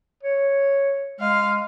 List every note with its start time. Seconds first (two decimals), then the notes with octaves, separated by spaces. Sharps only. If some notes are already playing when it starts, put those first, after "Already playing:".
0.23 C#5
1.20 G#3 F5